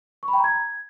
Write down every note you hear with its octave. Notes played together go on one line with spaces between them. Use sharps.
C#6
B5
G5
A#5
G#6